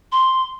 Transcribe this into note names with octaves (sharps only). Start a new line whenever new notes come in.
C6